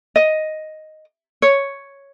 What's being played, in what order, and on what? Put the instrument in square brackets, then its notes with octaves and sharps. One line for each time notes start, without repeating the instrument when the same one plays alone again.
[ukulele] D#5
C#5